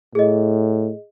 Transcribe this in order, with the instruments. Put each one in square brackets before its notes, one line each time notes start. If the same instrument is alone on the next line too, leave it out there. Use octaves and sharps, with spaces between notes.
[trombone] A2 [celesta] G#4 D#5